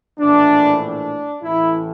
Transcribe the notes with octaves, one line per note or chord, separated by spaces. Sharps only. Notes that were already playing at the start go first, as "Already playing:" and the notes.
A#1 A2 E3 D4
D4
A1 A2 E3 E4